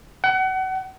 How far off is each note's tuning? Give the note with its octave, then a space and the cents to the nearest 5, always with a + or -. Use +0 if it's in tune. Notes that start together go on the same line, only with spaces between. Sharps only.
F#5 +30